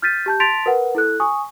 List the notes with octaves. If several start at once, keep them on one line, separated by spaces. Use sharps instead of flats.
F6 G6 A6 B6 D#7
G4 A5 G6
A5 C6 A6 B6 D7 F7
A#4 B4 F#5
E4 A4 F#6
G#5 C#6 D#6